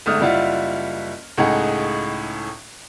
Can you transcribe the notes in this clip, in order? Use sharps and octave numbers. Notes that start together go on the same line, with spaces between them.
G1 G#2 A3 D#6 F6
F#1 G3 E4 F4 F#5
C#2 A2 D#4 G#4 F#5